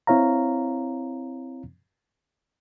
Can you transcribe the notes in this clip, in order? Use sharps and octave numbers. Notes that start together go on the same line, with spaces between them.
C4 E4 C#5 F5 A#5